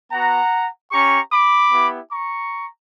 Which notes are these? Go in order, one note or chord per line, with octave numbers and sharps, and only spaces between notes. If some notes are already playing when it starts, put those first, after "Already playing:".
B3 F#4 F#5 A#5
C#4 G4 A#5 C#6
B5 D6
B3 E4 G4
A#5 C#6